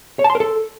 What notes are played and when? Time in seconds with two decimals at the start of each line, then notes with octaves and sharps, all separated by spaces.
0.19 C#5
0.24 A5
0.30 C6
0.35 A#4
0.40 A4